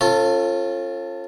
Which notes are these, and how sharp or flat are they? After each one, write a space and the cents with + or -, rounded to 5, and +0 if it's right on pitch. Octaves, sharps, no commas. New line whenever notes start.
C#4 -40 F4 -10 A4 +20